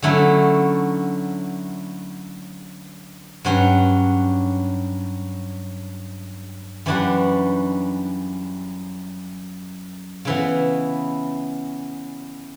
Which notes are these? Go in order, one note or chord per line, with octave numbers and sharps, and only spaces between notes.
D3 F#3 A3 C#4 E4
G2 F#3 C#4 F#4
F#2 E3 G3 D4 F#4
C#3 E3 B3 E4